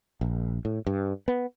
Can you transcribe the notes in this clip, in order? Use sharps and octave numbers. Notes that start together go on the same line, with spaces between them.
A#1
A2
G2
B3